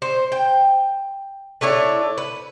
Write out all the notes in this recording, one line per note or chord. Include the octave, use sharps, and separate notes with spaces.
C5
G5
A3 D4 E4 C#5
B4